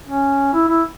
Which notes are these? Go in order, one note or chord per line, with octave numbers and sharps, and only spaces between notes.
C#4
E4
E4